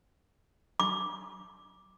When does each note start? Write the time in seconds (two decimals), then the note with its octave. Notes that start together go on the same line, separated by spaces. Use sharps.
0.80 D6